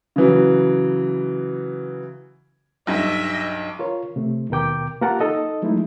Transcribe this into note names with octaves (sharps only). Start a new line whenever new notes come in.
C#3 E3 F#3
B1 G2 D#5 E5
F4 A#4 C#5
C3 A3
D#2 B2 A#4 G5 D6
A#3 F4 G4 A#4 F#5 A5
D#4 A4 D#5
F3 F#3 G#3 A3 D#4 E4